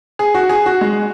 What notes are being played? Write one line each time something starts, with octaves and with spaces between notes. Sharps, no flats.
G#4
F#4
G#4
F#4
G#3